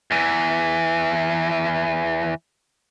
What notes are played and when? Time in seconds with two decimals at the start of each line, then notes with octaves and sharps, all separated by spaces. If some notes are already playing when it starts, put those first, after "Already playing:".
0.11 E2 E3